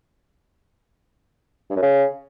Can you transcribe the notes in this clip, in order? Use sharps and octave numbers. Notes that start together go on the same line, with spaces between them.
G2
F#2
C#3